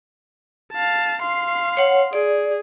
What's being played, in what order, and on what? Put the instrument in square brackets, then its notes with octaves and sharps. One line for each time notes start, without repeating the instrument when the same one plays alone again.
[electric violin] F5 A5
F5 C6
[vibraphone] C#5 F#5
[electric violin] G#4 [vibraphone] D5